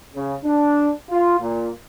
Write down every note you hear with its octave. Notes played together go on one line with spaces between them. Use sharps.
C#3
D4
F4
A#2